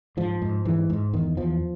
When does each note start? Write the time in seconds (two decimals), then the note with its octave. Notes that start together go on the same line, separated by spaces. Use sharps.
0.17 G#2 F3
0.42 G#2
0.65 G#2 E3
0.90 G#2
1.13 E2 D#3
1.37 E2 F3